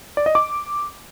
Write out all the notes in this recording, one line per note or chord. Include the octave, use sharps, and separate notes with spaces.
D5
D#5
D6